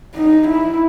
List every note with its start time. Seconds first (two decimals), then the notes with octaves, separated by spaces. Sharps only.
0.16 D#4
0.48 E4